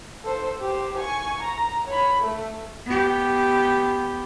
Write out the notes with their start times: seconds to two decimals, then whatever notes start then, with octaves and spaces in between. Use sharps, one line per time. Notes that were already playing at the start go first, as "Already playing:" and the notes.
0.24 A4 C5
0.61 G4 C5
0.97 G#5 C#6
1.42 A#5
1.87 C#5 B5
2.19 A3
2.86 B3 G4